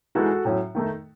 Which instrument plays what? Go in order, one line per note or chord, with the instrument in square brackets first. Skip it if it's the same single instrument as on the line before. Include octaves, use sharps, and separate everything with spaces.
[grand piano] E3 G#3 D#4 F#4 A4
A2 F#3 C#4
D#3 A3 D#4